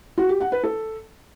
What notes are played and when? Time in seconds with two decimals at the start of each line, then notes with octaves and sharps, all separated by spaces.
0.18 F#4
0.29 G4
0.41 F#5
0.52 B4
0.64 A4